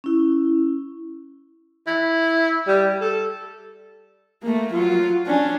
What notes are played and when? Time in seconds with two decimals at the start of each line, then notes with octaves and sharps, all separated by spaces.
0.04 C#4 E4
1.87 E4
2.67 G3
3.01 A4
4.43 A3 A#3
4.73 F#3 F4
5.27 C#4 D4